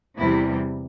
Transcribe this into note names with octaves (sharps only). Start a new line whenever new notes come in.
E2 C3 E3 G3 E4